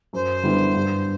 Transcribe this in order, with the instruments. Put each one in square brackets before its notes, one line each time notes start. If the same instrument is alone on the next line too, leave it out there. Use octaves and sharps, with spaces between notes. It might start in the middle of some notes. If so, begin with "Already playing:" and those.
[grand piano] F#2 [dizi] C5
[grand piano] D3 G3 B3 E4
G2